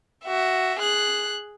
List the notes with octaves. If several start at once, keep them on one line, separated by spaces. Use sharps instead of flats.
F#4 E5
G#4 F#6